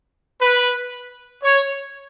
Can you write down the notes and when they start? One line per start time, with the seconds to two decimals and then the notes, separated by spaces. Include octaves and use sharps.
0.41 B4
1.43 C#5